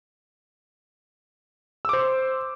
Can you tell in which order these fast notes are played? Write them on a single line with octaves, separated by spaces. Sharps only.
E6 D6 C5